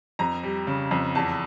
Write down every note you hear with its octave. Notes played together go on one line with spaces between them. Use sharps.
F2 A#5
G3
C#3
F2
E2 A5